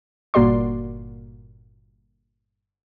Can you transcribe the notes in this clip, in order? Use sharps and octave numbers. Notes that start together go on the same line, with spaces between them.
G1 A#2 A#3 F#4 D5 C6